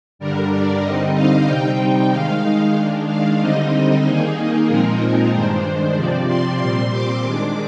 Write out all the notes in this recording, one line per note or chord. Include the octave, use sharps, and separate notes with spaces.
G2 D3 G3 D4 A#4
D5
D3 G3 C4 D#4 D#5
F5
C3 G3 C4 D#4 G5
G5
D#3 G#3 D#4 F5
D#3 G#3 D4
F5
D3 G3 C4 D#4 D#5
D#3 A#3 D#4 G#4
G#4
A#2 F3 G#3 C4 D#4 A#4
G2 D#3 G#3 D4 C5
C3 F3 C4 D5
C6
A#2 G3 C4
D6
D#3 G#3 D4 D6